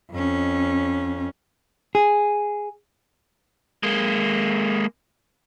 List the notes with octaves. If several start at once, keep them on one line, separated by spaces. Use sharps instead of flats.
F2 C#4
G#4
G#3 A#3